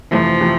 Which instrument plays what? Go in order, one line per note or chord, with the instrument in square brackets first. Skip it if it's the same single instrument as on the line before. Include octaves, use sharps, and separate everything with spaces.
[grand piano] F2 C3 E3 A3 [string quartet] F3
[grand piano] C3 E3 A3